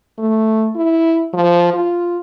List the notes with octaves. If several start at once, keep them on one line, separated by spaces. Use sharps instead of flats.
A3
E4
F3
F4